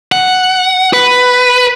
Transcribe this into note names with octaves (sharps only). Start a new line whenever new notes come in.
F#5
B4